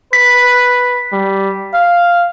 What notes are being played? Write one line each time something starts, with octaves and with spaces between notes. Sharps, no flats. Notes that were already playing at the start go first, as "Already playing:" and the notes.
B4 B6
G3
F5